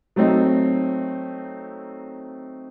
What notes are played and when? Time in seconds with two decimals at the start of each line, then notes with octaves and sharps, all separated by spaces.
0.16 F#3 A3 C4 D#4